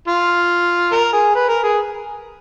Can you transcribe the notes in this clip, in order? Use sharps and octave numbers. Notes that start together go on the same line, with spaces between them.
F4
A#4
G#4
B4
A#4
G#4